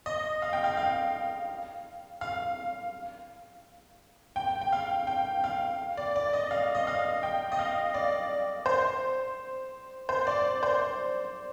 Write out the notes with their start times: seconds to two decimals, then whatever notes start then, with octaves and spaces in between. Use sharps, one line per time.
0.06 D#5
0.42 F5
0.53 G5
0.64 F5
0.77 F5
2.21 F5
4.36 G5
4.61 G5
4.72 F5
5.07 G5
5.44 F5
5.97 D5
6.16 D5
6.33 D#5
6.51 F5
6.75 D#5
6.87 F5
7.23 G5
7.52 D#5
7.59 F5
7.94 D5
8.66 C5
10.09 C5
10.27 D5
10.63 C5